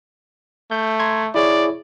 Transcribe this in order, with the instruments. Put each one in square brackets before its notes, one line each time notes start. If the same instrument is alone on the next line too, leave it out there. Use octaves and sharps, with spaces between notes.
[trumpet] A3 [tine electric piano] G6
[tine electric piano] A#5 C6 G#6
[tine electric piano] E4 G#4 C#5 [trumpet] D5